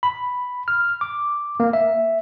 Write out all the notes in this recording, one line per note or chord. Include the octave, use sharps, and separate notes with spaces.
B5
F6
D6
A#3
E5